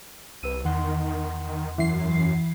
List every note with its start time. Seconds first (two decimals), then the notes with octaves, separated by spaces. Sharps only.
0.43 C2 B4 E6 D#7
0.65 E2 D#3 F#5 C6
1.78 F#2 E3 C7